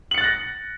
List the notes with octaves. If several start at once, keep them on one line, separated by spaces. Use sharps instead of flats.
F#6 A6 A#6 C#7 F#7